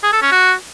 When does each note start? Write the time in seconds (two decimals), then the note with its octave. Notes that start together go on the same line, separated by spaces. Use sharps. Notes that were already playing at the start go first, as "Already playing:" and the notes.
0.03 G#4
0.13 A4
0.22 C#4
0.31 F#4